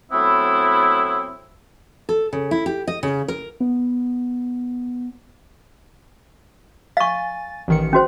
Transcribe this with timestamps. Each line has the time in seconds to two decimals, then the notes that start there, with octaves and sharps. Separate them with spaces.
0.12 F#3 A3 B3 C4 E4
2.09 A4
2.33 C#3
2.51 E4
2.66 G4
2.88 D#5
3.03 C#3
3.28 A#4
3.60 B3
6.97 F5 G#5 C#6 A6
7.68 A1 D#3 C#7
7.93 C#4 F#4 C5